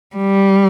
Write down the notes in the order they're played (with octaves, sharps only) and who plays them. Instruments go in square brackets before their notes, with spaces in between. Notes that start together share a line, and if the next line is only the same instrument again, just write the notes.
[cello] G3